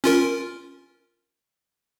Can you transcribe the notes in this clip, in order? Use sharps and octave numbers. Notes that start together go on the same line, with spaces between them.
C#4 F4 A#4